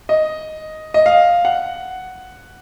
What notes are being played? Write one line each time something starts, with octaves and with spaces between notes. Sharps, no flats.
D#5
D#5
F5
F#5